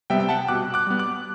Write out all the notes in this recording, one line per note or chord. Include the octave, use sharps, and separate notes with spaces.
C3 G3 B3 E5 G5
G5
F#5 A5
B2 D6 F#6
D6 F#6
G3 B3
D6 F#6